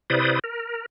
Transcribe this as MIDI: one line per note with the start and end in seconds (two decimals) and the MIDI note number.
0.10 0.39 48
0.10 0.39 64
0.10 0.39 71
0.10 0.39 72
0.10 0.39 74
0.10 0.39 87
0.44 0.86 70